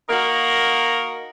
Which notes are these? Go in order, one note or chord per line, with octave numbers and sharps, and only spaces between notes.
A#3 D#4 F#4 A#4